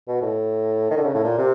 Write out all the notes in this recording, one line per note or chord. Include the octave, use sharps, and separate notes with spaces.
B2
A2
D#3
D3
C#3
A2
A#2
C3